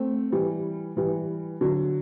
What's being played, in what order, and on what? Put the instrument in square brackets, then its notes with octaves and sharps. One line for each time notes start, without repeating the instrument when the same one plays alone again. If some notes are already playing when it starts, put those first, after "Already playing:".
Already playing: [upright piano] A3 C4
E3 G3
E3 G3
D3 F#3